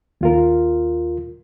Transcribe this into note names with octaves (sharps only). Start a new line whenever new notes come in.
D#2 F4 A#4